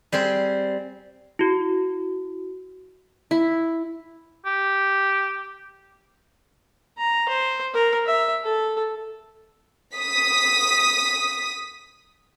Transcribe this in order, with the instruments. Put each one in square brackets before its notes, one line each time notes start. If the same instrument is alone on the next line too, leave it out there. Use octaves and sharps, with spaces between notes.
[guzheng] G3 C4 G#4 C5
[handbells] E4 F#4
[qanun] E4
[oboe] G4
[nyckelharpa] A#5
C5
A#4
E5
A4
[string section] D#6 B6